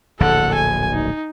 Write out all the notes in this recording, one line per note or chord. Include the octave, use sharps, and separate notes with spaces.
D1 A#1 D3 A4 F#5
G#5
D#4